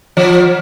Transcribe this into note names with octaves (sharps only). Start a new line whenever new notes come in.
F3